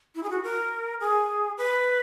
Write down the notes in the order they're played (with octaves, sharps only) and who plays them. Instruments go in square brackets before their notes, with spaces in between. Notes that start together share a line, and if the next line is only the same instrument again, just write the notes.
[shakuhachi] E4
G#4
F#4
A#4
G#4
B4